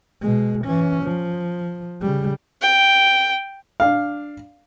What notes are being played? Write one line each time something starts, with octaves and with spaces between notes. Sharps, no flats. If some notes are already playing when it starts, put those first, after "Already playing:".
B2 G#3
E3 C#4
F3
C#3 G3
G5
D4 F5